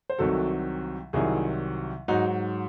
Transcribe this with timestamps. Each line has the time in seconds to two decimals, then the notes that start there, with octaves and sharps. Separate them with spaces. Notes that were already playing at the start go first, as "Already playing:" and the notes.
0.10 C5
0.18 C2 C3 D#3 F#3 F#4 A4
1.13 C2 C3 D#3 F#3 E4 G#4
2.08 G#2 F#3 D#4 F#4